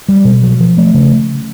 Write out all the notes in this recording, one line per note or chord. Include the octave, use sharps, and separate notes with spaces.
G3
B2
F#3
F3
A3
C#3